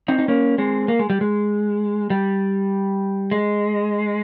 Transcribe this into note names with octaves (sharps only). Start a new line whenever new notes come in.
C4 D#4
D#4
A#3 C#4
G#3 C4
A#3
G#3
G3
G#3
G3
G#3